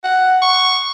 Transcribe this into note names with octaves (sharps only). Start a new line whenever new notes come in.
F#5
C#6